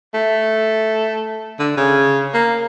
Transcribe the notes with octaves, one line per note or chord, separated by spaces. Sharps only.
A3
D3
C#3
A#3